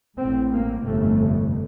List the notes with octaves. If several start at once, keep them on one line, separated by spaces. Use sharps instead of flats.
A1 A2 C4
A#3
G1 F2 C3 A3